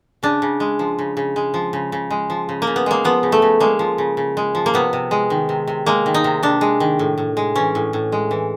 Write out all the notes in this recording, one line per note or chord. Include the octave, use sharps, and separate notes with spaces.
C#3 D4
C#3
G#3
F3
C#3
C#3
G#3
F3
C#3
C#3
G#3
F3
C#3
A#3
C#3
B3
G#3 A#3
F3 B3
C#3
A3
C#3
G#3 A#3
F3
C#3
C#3
G#3
F3
A#3
C3 B3
C3
G#3
D#3
C3
C3
G#3 A#3
D#3
D#4
C3
C3 D4
G#3
D#3
A2
A2
G#3
E3 C#4
A2
A2
G#3
E3